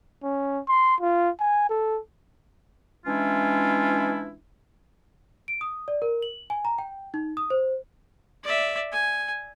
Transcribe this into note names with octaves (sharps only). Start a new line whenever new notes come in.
C#4
C6
F4
G#5
A4
E3 G#3 C#4 D4 E4 F4
D7
D#6
D5
A#4
F#7
G#5
A#5
G5
D#4
D#6
C5
D5 E5
G#5